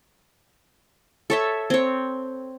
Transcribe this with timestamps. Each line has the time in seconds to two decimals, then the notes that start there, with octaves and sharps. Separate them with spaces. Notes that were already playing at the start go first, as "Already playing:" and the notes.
1.30 A4 C#5 E5
1.70 C4 C#5